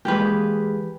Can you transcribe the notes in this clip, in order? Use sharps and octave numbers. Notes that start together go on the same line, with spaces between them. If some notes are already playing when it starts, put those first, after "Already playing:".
E3 G#3 A#3 G4 G#4 B4